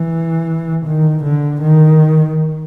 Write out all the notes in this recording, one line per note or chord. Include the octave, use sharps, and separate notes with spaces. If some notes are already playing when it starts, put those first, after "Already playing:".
Already playing: E3
D#3
D3
D#3